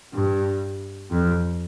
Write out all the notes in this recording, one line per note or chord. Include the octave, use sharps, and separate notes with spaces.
G2
F2